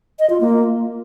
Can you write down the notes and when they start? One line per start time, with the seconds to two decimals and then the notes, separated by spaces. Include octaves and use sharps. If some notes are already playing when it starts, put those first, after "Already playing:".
0.19 D#5
0.30 F4
0.41 A#3